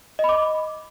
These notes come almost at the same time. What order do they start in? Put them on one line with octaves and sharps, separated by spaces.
D#5 B5 D6